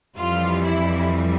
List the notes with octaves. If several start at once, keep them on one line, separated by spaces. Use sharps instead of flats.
F2 E3 G3 F4
E4